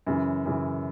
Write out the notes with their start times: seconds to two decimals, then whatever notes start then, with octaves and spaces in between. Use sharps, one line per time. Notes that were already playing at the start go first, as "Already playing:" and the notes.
0.07 F#2 C#3 E3
0.46 F#2 C#3 E3